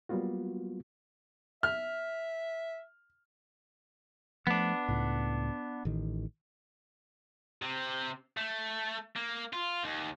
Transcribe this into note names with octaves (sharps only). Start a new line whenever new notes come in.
F#3 G3 A#3 B3 F4 F#4
E5 F6
F3 A3 B3 D4
C#2 A2
A1 D#3
C3 C4
A3
A#3
F4
D#2